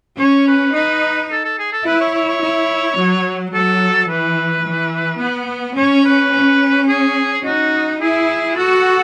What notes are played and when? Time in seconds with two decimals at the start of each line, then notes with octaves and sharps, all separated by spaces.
0.19 C#4 C#5
0.48 B4
0.74 D#4 B4
1.31 A4
1.44 A4
1.59 G#4
1.73 A4
1.86 E4 B4
2.00 C#5
2.15 C#5
2.28 C#5
2.43 E4
2.98 F#3
3.54 F#3 A4
4.09 E3 B4
4.66 E3
5.21 B3
5.77 C#4 C#5
6.05 B4
6.33 C#4
6.88 G#4
7.45 D#4 F#4
8.00 E4 G#4
8.55 F#4 A4